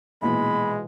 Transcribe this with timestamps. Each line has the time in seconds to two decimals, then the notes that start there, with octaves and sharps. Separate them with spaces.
0.22 A#1 B2 E3 G#3 B5